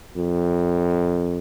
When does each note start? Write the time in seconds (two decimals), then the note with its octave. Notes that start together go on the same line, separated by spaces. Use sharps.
0.16 F2